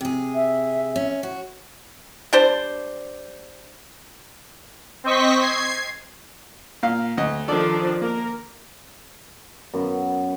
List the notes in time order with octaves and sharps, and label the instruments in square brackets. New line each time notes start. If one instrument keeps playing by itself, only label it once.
[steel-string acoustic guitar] C3 G#4
[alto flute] E5
[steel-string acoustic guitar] C#4
F#4
[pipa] G3 D4 C5
[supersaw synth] C4 C5 D#5 C#6 B6
G#6 C7
[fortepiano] A#2 F5
D2 D#5
[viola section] D#3 F3 D4 [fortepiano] A4 D5
[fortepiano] A#3 [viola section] A#4
[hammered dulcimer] F#2 B3 F#4